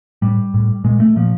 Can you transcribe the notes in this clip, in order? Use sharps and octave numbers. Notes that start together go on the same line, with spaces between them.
A2 G3
A2
A#2 G#3
A3
A#2 F3